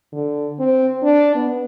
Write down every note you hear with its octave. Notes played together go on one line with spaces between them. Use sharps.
D3
C4
D4
B3